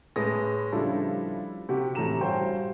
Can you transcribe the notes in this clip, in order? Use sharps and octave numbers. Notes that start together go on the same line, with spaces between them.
A2 G#3 B4 D#6 A#6
C#3 F3 G3 D4 E4 A4
C3 F#4 G4
A2 E3 A4 A#5 E7
G2 F#4 C5 C#5 G5 C6